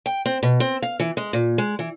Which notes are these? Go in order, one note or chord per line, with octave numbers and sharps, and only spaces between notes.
G5
C4
B2
C4
F5
E3
G#3
A#2
G#3
E3